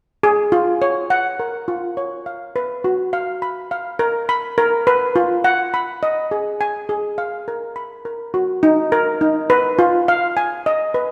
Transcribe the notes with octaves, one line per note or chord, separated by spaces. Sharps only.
G#4
F4
C#5
F#5
A#4
F4
C#5
F5
B4
F#4
F5
B5
F5
A#4
B5
A#4
B4
F4
F#5
B5
D#5
G#4
G#5
G#4
F5
A#4
B5
A#4
F#4
D#4
A#4
D#4
B4
F4
F5
G#5
D#5
B4